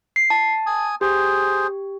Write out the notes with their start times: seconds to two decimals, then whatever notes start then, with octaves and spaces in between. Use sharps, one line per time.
0.16 C7
0.30 A5
0.66 G#5 D#6
1.01 G4 G#4 C5